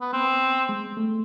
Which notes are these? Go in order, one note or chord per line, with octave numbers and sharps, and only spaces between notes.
B3
B3 C4
G#3
A3